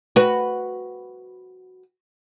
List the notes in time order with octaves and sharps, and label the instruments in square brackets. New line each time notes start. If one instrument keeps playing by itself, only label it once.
[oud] F#4 B4